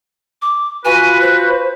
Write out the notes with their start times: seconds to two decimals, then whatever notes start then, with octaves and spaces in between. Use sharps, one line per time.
0.42 D6
0.85 F4 F#4 B4 G#5
1.21 C5